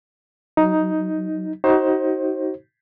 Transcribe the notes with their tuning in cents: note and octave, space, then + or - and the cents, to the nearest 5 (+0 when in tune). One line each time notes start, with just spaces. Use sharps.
F#3 +10 D#4 +10
D#4 +20 F#4 +35 C5 +30